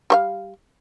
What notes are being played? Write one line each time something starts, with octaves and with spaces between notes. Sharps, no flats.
G3 C#5 F5